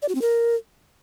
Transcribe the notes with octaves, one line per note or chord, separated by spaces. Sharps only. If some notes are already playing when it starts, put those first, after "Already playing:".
D5
F#4
C4
A#4